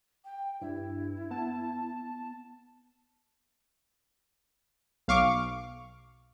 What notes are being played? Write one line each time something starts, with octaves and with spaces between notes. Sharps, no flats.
G5
G2 E4
B3 A5
B1 F5 C#6 D6